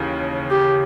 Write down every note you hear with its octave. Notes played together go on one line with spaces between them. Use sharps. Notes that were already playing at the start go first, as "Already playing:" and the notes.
Already playing: D#2 C#3 E3
G4